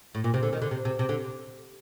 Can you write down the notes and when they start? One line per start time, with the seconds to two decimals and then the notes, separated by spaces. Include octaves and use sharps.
0.15 A2
0.24 A#2
0.34 C3
0.43 D3
0.53 D#3
0.62 D3
0.71 C3
0.85 C3
0.99 C3
1.09 D3